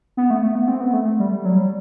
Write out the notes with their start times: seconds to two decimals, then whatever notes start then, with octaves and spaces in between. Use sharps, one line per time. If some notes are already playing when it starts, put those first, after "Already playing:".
0.17 B3
0.30 A3
0.43 A3
0.55 B3
0.68 C4
0.80 B3
0.93 A3
1.19 G3
1.31 G3
1.45 F#3
1.57 G3